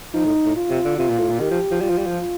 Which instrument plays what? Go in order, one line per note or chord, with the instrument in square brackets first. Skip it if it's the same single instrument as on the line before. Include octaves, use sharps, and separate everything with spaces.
[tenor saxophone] F3 [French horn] D#4
[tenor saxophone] A2
A2
[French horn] F4
[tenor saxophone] C3
D3
[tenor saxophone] C3 [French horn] F4
[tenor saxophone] A#2
A2
A#2
[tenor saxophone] D#3 [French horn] G4
[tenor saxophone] F3
F3
[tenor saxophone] G3 [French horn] F4
[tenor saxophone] F3
G3
F3